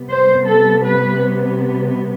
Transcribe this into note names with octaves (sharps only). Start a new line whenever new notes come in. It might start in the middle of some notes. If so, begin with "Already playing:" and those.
Already playing: C3 G3 B3
C5
A4
B4